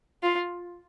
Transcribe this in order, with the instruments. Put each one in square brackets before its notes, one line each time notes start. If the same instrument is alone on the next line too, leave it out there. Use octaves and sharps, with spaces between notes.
[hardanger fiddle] F4